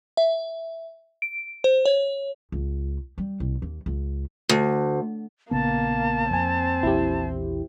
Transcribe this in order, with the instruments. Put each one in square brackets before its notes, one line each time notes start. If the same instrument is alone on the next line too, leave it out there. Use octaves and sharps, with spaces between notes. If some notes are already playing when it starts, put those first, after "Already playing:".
[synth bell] E5
D7
C5
C#5
[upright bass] C#2
G3
C2
D#2
C#2
[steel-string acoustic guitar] D2
[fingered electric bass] A#1 C#3 B3 [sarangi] A#3 [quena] A5
[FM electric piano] F2 G#5 [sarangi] C4
[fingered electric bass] A#1 E2 [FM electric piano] E4 G4